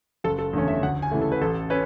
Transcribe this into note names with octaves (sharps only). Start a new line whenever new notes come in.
F#1 A4
A4
E2 D3 A3 C#4
E5
D2 F#5
G#5
C#3 E3 A3
A4
B4
A1 A4
C#4 B4